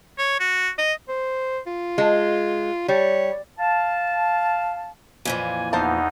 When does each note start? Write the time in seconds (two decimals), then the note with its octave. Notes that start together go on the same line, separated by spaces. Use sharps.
0.18 C#5
0.40 F#4
0.78 D#5
1.09 C5
1.66 F4
1.98 G#3
2.88 G3 C#5
3.59 F5 A5
5.25 F2 A#2 E3 G#5
5.73 E2 B3 D#4 C5 F5 A5